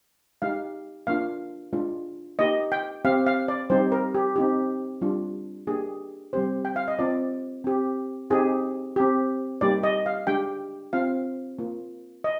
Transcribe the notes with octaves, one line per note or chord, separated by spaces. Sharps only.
G#3 D#4 G4 F5
A#3 D4 F4 F5
G#3 D4 F4
A#3 D#4 G4 D#5
G5
C4 G4 F5
F5
D5
G3 C4 D#4 G4 C5
A#4
G4
C4 D#4 G4
G3 D4 F4
A#3 D4 G4 G#4
G3 C4 G4 C5
G5
F5
D#5
C4 F4 D5
C4 G4
C4 D#4 G4 G#4
C4 G4
G3 A#3 D#4 G4 D5
D#5
F5
G#3 D4 G4 G5
C4 F4 F5
A#3 F4
D#5